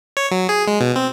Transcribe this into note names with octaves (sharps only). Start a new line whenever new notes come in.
C#5
F#3
G#4
G#3
B2
C4